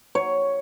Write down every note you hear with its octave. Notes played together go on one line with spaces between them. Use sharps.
C#5